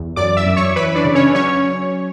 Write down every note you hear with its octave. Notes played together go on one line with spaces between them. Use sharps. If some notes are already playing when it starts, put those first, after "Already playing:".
Already playing: E2
F#2 D5 D6
E5 E6
F#2
C#5 C#6
E3 B4 B5
D4 D5
C#3
C#4 C#5
F#3 C#4 C#5